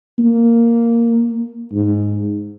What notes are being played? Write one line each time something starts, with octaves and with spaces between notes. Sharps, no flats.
A#3
G#2